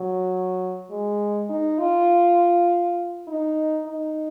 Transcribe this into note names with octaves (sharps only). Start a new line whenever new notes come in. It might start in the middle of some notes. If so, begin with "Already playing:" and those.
Already playing: F#3
G#3
D#4
F4
D#4
D#4